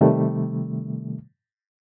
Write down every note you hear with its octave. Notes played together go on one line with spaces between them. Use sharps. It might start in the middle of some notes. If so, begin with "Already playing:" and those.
C3 D#3 G3 A3